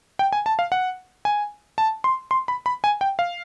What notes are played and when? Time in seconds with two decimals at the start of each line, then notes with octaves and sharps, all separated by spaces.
0.19 G5
0.33 G#5
0.46 A5
0.59 F5
0.72 F#5
1.25 G#5
1.78 A5
2.04 C6
2.31 C6
2.48 B5
2.66 B5
2.84 G#5
3.01 G5
3.19 F5